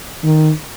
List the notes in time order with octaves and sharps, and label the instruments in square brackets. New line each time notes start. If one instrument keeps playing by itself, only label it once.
[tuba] D#3